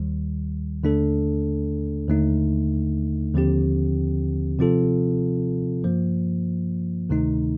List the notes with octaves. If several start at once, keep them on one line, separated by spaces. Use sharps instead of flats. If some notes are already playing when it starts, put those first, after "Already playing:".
Already playing: D#2 D#3 G3
D#2 D3 A3 D4 A4
D#2 D3 A3 D#4
D#2 D3 F3 C4 G4
C3 F3 C4 F4 A4
G2 F3 A#3
D2 C3 D#3 A3 D#4